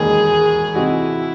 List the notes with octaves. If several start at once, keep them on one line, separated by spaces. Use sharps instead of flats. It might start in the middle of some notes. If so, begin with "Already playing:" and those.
Already playing: E1 D#2 D#3 G#3 G#4
C3 E3 C4 D#4 E4 F#4